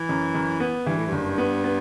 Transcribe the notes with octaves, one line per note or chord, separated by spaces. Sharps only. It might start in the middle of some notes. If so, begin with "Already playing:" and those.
Already playing: E3
F#2
F#2
B3
G2 E3
A2
G2
F#1
B3
B3